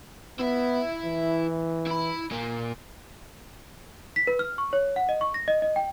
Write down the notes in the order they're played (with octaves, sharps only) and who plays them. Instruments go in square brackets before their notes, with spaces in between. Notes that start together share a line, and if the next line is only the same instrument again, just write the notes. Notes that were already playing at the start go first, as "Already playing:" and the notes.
[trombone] B3 [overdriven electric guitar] E4 E5
[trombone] E3
[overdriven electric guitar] E4 B5
A#2 A#3
[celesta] B6
B4
F6
C#6
C#5
F#5
D#5
C#6
A#6
D#5
D#5
G5